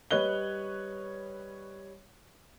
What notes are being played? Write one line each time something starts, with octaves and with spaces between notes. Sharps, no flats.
G3 B4 C#5 D#5 F#6 G7